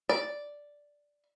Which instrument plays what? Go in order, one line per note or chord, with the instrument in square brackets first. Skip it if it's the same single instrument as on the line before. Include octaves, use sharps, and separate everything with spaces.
[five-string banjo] D5